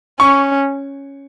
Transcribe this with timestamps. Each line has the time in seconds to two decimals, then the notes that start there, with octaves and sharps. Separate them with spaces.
0.20 C#4 C#6